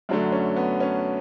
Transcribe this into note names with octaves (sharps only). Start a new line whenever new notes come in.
F#2 D3 F#3 A3 D4
C#4
B3
C#4